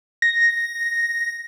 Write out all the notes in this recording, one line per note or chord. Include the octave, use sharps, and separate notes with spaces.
A#6